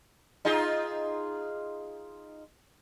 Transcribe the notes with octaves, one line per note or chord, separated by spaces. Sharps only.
D#4 F4 G#4